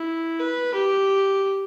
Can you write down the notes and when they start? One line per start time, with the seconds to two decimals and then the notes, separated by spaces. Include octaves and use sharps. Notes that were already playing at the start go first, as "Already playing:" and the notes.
Already playing: E4
0.39 B4
0.74 G4